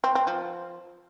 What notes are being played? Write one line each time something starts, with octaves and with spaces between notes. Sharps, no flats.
C4
C4
F3